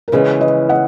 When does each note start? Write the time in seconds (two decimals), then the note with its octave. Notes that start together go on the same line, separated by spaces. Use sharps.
0.08 A#4
0.12 C#3 E3 G#3 B3 G#4 B4
0.41 B4 D#5
0.69 D#5 F#5